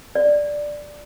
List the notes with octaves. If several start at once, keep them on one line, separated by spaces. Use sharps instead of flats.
D5